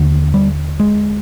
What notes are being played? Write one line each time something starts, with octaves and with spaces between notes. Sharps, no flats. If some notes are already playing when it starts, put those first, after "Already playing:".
Already playing: D#2 D3
G3
G#3